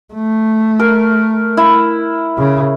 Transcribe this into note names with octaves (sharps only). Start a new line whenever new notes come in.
A3
A#4
E4
C#3